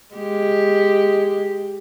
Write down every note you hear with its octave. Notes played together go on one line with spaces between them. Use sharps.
G#3 G4